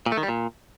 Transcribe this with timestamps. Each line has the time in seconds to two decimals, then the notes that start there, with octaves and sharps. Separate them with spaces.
0.06 A#2
0.12 A3
0.17 D#3
0.23 G3
0.29 A#2